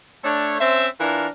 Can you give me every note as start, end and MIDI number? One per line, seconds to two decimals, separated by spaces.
0.24 0.58 57
0.24 0.58 62
0.24 0.58 69
0.24 0.58 73
0.61 0.88 60
0.61 0.88 61
0.61 0.88 72
0.61 0.88 76
1.00 1.28 52
1.00 1.28 62
1.00 1.28 65
1.00 1.28 70